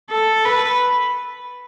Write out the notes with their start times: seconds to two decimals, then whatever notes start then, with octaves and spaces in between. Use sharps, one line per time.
0.11 A4
0.45 B4